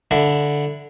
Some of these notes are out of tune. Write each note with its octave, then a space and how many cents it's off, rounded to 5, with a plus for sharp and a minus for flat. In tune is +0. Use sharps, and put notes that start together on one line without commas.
D3 -5 E4 +0